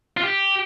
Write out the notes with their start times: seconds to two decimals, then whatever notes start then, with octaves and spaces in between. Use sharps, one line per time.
0.17 F4
0.23 G4